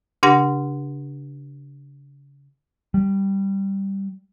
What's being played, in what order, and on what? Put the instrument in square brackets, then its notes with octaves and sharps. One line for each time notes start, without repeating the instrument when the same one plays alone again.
[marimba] C#3 D4 G4 F#5 C6 A#6
[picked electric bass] G3